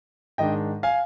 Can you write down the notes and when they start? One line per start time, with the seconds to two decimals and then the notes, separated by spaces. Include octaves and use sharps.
0.38 G#2 D#3 G#3 D4 D#5 G5
0.83 F5 G#5